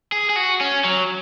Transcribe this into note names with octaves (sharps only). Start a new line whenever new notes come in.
G#4
G#4
F#4
C#4
F#3